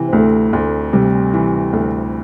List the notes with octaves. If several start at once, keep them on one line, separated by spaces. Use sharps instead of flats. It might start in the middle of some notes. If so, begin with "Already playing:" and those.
Already playing: C3 E3
C4
D2 A3
D2
C3 G3
E3
D2